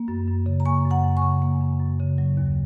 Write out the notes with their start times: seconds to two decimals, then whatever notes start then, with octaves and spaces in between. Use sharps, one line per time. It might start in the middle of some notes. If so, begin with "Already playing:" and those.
Already playing: A#3
0.08 F#2
0.27 F#2
0.46 C#3
0.60 A#5
0.65 A#3 G#5 C#6
0.85 F#2
0.91 F#5 A#5
1.04 F#2
1.16 G#5 C#6
1.22 C#3
1.42 A#3
1.61 F#2
1.79 F#2
1.99 C#3
2.18 F#3
2.37 D#2